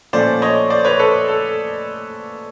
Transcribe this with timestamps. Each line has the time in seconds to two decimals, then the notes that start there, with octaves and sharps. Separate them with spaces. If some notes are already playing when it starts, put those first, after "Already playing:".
0.13 A#2 F3 A3 C#4 C5 D5
0.42 C#5 D#5
0.70 C5 D5
0.85 B4 C#5
0.99 A4 B4
1.28 A4